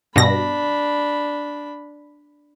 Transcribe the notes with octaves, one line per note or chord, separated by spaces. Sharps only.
G2 B2 D4 B5 A#6